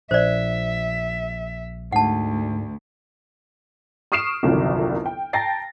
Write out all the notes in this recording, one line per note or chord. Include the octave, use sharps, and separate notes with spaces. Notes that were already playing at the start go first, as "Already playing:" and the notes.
A#1 C5 D5 E5
D2 G#2 F#5 A5
C#6 D#6 F6 C7 D7 E7
G1 C2 F2 C3 D#3 F#3
G5
G5 A5 A#5 A6 A#6 C7